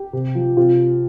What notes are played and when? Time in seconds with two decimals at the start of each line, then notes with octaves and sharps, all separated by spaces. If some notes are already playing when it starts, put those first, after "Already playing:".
Already playing: G4
0.13 C3
0.35 F3
0.57 C3 F4